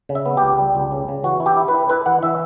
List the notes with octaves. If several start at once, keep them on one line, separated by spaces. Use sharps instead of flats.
C#3
E5
B3
G4
C#2
G3
C#2
C#3
C#3
E3 F#4
E4
G4
E4
B4
E4
E4 B4
E3 F#5
E3 E5